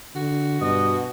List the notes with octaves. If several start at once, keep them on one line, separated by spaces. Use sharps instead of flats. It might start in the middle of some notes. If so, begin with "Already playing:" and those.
D3 F#4
G2 B2 D#5